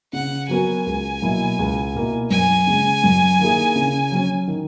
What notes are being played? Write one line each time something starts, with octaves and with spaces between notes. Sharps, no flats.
C#3 F#5
F#3 B3 F#4 A#4 G#5
C#2
B2 F#3 A#3 E4
C#2
B2 A#3 E4
F#2 G#5
C#3 G#3
F#2
D#3 A#3 E4 G#4
C#3
F#3 C#4
D#3